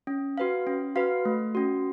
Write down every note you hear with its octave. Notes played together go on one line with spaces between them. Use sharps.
C#4
F#4 B4 F5
C#4
F#4 B4 F5
A3
C#4 F#4